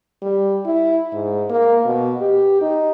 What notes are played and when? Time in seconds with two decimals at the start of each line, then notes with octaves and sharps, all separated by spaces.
0.22 G3
0.66 E4
1.13 G#2
1.50 A#3
1.85 B2
2.21 G4
2.61 D#4